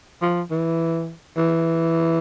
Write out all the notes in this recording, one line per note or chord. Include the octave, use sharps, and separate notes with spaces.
F3
E3
E3